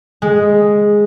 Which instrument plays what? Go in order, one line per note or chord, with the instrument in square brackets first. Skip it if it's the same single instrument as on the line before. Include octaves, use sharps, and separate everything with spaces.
[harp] G#3